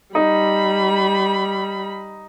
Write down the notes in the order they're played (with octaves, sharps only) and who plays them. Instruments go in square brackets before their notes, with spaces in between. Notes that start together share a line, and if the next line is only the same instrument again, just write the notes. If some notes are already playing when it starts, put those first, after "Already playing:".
[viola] G3 B5 [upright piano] D#4